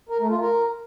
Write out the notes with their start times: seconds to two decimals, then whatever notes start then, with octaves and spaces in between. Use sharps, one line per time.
0.09 A#4
0.19 A3
0.30 F4
0.40 A#4